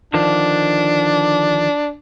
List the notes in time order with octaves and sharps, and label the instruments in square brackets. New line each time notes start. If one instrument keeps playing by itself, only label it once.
[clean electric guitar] D3 D#3 F3 [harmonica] D4